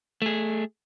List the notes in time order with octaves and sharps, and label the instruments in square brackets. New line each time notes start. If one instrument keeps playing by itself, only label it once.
[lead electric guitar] A3 G#4